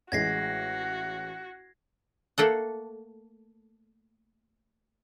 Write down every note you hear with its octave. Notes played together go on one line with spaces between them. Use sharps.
A1 G#3 F#4 G#6 A#6 C7
A3 A#3 A4 F#5